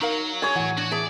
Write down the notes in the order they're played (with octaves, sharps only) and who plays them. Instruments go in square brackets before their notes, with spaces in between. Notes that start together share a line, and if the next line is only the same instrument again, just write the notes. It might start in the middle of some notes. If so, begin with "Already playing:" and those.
[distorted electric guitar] F#3 [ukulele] D#4 A#4 F5
[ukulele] G#4 [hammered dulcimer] C#5 G#5 [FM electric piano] A6
[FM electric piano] A2 E3 [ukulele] F#5
[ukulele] D4 [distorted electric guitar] F#4
[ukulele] G#4 E5 A5 [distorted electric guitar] D5